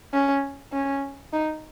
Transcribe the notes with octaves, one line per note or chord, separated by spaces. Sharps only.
C#4
C#4
D#4